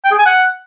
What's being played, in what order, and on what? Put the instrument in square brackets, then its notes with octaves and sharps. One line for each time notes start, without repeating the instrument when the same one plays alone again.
[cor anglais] G5
G#4
G#5
F#5